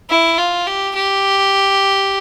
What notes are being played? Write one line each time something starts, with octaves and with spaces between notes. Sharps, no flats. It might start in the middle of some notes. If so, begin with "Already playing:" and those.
E4
F4
G4
G4